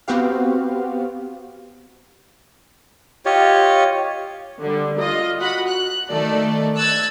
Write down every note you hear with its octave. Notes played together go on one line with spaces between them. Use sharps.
B3 C4 F#4 G4 F5
F4 G4 C#5 D#5
D3 G3
F4 D#5
F#4 F#5 B5
F#6
D#3 A3 A4 D5
E6 F#6 G#6 A6